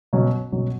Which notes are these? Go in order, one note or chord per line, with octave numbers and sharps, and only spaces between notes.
B2 F#3 C#4
B2 F#3 C#4